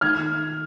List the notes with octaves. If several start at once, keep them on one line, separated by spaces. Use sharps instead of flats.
D#3 F6 G#6